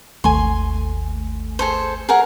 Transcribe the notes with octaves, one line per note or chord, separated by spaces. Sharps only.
G#1 D#2 A3 G#5 C6
G#4 A4 C5
G#4 A#4 F#5